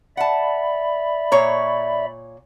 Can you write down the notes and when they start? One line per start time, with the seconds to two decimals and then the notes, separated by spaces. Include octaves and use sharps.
0.17 D5 E5 F#5 A5 B5
1.32 A#2 C#5 A#5